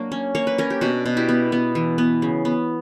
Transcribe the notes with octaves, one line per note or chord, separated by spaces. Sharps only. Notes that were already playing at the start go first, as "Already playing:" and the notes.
Already playing: F#3 A#3 D4
C#4
A#3 C#5
B4
C#4 A#4
G4
B2 D4 F#4
B2
E4 G4
B3
B3
E3
B3
C#3
B3